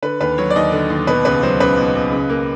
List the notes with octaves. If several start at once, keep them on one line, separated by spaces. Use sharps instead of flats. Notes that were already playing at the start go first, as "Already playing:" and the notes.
D3 B4
D#2 B4
F#3 C#5
D5
D#2 D#5
D3
D#2
B2 B4
C#2 B4
F#3 C5
C#2 B4
B2
C#2
C#3
A#3